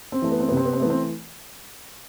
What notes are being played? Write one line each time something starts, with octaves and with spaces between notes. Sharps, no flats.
C4
E3 A3
B3
C4
C3 B3
C4
B3
C4
E3 A3 B3
C4